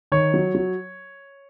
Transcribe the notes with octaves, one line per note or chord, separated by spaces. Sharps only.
D#3 C#5
F#3
F#3